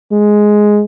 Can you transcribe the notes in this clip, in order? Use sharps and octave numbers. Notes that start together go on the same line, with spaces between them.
G#3